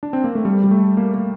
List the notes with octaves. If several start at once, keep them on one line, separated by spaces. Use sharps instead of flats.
D4
C4
A#3
A3
G3
G3
A3
A#3
A#3